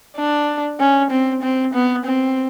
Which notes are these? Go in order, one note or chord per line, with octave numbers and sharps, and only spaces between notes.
D4
C#4
C4
C4
B3
C4